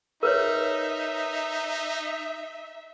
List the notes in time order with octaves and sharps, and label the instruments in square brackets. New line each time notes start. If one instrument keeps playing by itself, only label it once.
[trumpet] D#4 [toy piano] A#4 B4 C#5 [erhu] E5